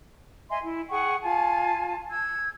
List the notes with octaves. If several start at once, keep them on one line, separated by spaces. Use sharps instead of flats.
D#5 E5 G#5 C6
E4
G#4 F#5 G5 C#6
F4 G#5 A5
E6 G#6